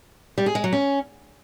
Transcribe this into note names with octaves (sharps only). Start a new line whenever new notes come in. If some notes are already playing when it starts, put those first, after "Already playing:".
G3
G#4
G#3
F#3
C#4